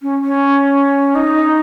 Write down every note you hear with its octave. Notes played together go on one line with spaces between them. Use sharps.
C#4
C#4
D#4